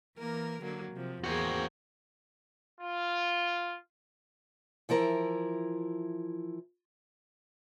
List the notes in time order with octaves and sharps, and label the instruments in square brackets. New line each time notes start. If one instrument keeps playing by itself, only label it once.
[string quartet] E3 A#3 A#4
D3 F#3 A#3
C3 F3
[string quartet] E2 A#3 G#4 [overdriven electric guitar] C4 F#4
[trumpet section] F4
[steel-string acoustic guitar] E3 F3 E4 A#4